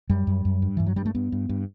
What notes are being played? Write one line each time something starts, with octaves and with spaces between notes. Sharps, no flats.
F#2 G3
F#2
F#2
G2
G2 E3
F#3
G2 G3
A3
G2 B3
G2
G2